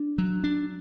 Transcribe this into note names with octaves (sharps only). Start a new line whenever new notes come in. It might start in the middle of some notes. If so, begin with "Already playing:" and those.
Already playing: D4
F#3
D4